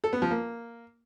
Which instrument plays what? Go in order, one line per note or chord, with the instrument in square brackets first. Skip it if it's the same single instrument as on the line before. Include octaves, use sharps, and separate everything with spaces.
[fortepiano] A4
B3
F3
A#3